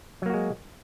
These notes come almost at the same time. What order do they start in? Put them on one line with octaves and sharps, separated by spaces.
F#3 A#3 F#4 G#3